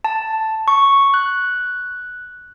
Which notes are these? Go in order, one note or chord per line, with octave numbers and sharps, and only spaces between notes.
A5
C#6
F#6